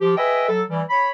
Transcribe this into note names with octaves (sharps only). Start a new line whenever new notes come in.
F3 G4
G#4 B4 D#5 E5 G5
F#3 A4
E3 G3
C#5 B5